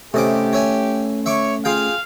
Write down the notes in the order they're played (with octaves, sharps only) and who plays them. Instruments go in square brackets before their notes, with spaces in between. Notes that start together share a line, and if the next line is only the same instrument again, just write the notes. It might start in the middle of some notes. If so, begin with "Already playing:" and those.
[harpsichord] C3 D#5 D6 [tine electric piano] A3 C#4 [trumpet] G4
[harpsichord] C#5 E5 G#5
[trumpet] C#5 [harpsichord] E5 C#6 D6
[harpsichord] F4 G#4 G5 [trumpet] F5